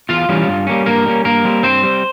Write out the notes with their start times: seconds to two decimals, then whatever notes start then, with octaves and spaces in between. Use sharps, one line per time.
0.09 E2 F4 F5
0.29 E3 G3 C#4
0.48 G2
0.67 G3 A#3 C#4
0.86 G2 A#3 A#4
1.06 G3 A#3 C#4
1.24 G2 A#3 A#4
1.44 G3 C4
1.63 G2 C4 C5
1.83 G3 C4